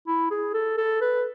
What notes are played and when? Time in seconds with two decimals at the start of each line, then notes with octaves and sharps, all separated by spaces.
0.07 E4
0.31 G#4
0.54 A4
0.77 A4
1.01 B4